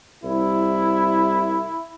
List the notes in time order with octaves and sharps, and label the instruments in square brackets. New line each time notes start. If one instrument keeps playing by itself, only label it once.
[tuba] C2 [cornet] E4